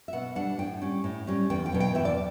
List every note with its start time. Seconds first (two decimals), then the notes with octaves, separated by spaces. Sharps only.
0.08 E5
0.13 B2 F#5
0.35 G3 D4 F#5
0.59 A2 G5
0.82 G3 C#4
1.04 A2
1.27 G3 C#4
1.50 E2 G5
1.66 G5
1.72 B2 F#3
1.80 G5
1.95 E2 E5
2.05 D5